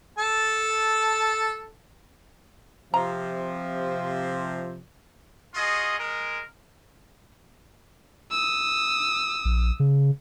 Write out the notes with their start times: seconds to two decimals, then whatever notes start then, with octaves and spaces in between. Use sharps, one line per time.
0.18 A4 A5
2.94 C3 F3 A#5
5.55 F4 F#4 G#4 D#5
5.99 G#3 A#4
8.31 D#6 E6
9.45 A#1
9.80 C#3